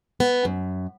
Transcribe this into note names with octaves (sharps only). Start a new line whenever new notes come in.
B3
F#2